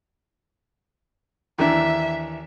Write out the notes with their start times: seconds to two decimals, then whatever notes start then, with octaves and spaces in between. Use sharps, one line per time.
1.58 D#2 E3 D4 E5